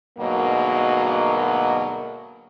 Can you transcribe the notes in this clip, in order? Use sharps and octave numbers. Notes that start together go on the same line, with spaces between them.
D2 G#2 B2 F#3 A#3